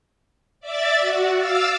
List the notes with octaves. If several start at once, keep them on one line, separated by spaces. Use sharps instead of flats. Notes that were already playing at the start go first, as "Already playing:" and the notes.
D5 E5 A6
F#4
F5 D6 E6 A6